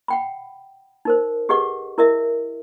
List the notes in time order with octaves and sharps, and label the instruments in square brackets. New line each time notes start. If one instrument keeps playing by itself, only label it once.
[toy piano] F#5 G5 B5
D#4 A#4 C5
G4 G#4 B4 D#5 F#5 C#6
E4 A#4 D#5 E5